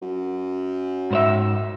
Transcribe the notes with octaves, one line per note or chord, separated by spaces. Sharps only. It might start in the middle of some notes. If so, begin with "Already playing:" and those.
F#2
G#2 C5 E5